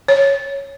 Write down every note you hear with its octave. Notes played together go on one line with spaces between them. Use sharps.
C#5